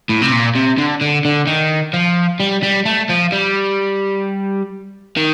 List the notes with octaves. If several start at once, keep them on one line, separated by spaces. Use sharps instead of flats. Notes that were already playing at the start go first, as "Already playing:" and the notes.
A2
C3
A#2
C3
D3
D3
D3
D#3
F3
G3
G3
A3
F3
G3
D#3